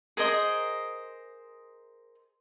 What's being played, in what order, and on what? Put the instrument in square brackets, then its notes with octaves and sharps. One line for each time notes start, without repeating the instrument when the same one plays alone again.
[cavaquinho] G#4 A#4 C5 D#5